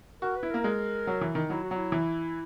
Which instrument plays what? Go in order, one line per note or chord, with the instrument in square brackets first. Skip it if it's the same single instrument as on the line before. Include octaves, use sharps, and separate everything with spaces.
[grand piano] F#4 [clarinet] A#4
[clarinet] B4
[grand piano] E4
[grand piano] A#3 [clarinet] A#4
[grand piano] G#3
F#3
E3
D#3
[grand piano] F#3 [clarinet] E4
[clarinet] F#4
[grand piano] F#3
[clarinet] E4
[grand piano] E3